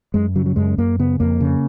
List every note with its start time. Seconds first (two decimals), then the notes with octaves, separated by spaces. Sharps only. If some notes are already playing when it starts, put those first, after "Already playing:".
0.14 F#2 G#3
0.36 C#3 F#3
0.46 F#3
0.56 F#2 G#3
0.78 F#2 A#3
0.99 C#3 B3
1.20 F2 A#3
1.41 C#3